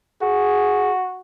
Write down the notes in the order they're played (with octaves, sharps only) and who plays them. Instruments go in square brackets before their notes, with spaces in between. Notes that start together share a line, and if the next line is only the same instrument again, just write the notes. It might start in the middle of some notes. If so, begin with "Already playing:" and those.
[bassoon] F#4 [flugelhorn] G#4